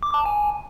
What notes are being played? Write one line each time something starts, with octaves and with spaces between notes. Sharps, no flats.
D6
A5
G#5